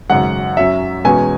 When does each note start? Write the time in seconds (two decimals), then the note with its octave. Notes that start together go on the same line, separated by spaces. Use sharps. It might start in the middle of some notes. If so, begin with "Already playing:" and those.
0.10 G#1 F#2 C#3 F#5
0.57 F#2 F#3 C#4 E5
1.05 E2 B2 G#3 C#4 G#5